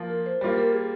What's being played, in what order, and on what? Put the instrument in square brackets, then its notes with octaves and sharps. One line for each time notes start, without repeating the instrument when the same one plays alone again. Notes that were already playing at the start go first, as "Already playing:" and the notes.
Already playing: [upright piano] F3 A#3 F4
[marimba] A#4
C5
[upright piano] G3 A#3 F4 [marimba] C5
[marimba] A#4
G#4